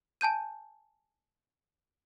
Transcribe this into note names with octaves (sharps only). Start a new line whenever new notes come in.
G#5 A5 G6 D#7